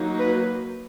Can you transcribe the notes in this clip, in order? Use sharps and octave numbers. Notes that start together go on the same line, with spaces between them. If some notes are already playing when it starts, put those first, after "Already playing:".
Already playing: F#3 A#3 D#4
B4